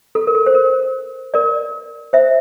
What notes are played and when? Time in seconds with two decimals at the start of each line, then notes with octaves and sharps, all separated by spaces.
0.15 A4
0.27 A#4
0.35 A4
0.46 C5
0.55 A#4
1.34 A#4 D5
2.13 C5 E5